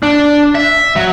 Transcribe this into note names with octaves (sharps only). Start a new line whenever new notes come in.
D4
E5
F#3